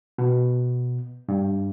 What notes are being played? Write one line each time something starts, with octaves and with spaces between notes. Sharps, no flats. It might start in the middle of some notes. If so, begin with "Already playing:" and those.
B2
G2